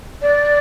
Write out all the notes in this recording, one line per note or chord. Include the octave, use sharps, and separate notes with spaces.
D5